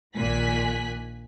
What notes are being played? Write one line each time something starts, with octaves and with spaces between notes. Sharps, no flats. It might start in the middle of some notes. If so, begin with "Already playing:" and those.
A#1 A#2 D#3 G#5 F#6 B6